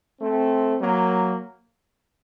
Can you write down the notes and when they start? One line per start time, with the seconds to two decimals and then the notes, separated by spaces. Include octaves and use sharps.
0.21 A3 C4
0.81 F#3 A#3